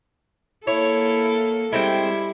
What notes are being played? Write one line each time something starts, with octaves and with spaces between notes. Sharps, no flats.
A#3 E4 A4 C#5
G3 G#3 C4 E4 G5